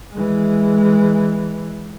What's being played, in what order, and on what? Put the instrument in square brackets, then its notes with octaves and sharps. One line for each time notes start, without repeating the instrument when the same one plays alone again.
[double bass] E3 G#3